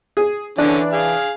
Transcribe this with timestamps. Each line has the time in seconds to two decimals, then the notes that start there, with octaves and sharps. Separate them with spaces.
0.17 G#4
0.58 D3 E3 C#4 D4 D5
0.93 G#4 F5